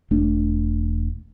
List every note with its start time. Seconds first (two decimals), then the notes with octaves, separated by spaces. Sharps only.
0.11 E1 A3 D4